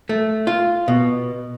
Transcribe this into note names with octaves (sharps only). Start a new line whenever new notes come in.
A3
F4
B2